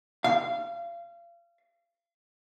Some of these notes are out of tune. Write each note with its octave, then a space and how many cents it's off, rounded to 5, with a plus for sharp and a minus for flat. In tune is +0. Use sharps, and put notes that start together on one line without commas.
F5 -30